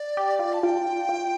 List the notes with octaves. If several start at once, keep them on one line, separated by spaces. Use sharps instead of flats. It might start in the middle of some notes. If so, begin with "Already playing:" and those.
Already playing: D5
G4
F4
A5
F4 G5
F4